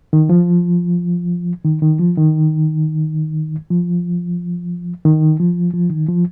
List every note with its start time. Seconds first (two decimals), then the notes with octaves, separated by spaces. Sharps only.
0.13 D#3
0.29 F3
1.65 D#3
1.82 D#3
1.99 F3
2.17 D#3
3.70 F3
5.05 D#3
5.40 F3
5.73 F3
5.90 D#3
6.08 F3